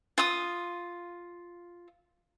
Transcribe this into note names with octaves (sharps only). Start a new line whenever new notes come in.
F4 D#6